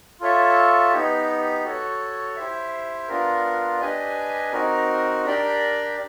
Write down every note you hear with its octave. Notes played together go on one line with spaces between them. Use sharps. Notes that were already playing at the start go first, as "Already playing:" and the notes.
F4 A4 C#5 E5
B3 D#4 G4
F#4 A4 C#5
E4 G4 C5 E5
B3 D4 F4 A#4
D4 G4 B4 D#5 G#5
C4 D#4 F#4 A#4
D4 G4 A#4 D5 G5